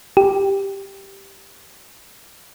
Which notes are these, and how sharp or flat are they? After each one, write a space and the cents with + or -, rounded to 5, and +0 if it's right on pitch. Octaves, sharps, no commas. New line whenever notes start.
G4 +0